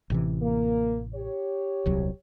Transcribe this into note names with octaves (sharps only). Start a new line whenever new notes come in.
A1 C3 E3
A#3
G4 C#5
D#1 C2 F#3